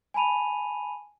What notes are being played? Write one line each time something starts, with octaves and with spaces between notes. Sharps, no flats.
G#5 A5 B5 D#7 F7